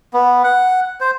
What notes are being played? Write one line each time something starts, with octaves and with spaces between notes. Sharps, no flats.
B3
F#5
C5